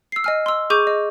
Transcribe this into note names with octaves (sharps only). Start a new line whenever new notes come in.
E6 C7
D#5 G#5 F6
C6 E6
G#4 C#6 D6 G6 D#7
D#5